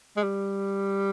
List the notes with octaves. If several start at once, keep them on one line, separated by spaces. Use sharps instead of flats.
G#3
G3